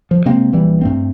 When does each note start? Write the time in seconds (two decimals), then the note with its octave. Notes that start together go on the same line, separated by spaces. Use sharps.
0.11 F3
0.25 C3 G#3 A#3 C4
0.52 A#1 E3 G3
0.81 G2 A3 C4